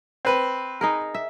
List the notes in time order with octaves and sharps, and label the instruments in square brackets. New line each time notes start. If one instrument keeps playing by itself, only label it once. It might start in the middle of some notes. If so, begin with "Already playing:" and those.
[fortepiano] C4 B4
[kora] D#4 G#4 A#4
E5